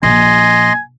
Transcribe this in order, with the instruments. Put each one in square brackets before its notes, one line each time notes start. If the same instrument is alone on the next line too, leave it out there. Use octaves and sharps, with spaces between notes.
[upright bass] A#1 [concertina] D#5 C6 [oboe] G#5